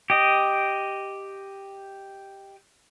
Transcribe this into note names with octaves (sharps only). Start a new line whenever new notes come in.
G4 D#5